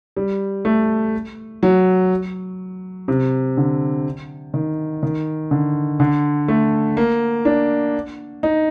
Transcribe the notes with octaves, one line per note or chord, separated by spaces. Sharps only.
G3
A3
F#3
C3
D3
D#3
D#3
D3
D3
A3
A#3
D4
D#4